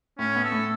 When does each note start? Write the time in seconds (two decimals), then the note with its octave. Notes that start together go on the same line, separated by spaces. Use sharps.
0.18 A2 C#4
0.35 B3
0.44 A4
0.52 A2